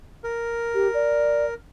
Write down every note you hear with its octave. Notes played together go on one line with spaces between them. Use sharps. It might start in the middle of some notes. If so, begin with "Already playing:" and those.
A#4
G4
D5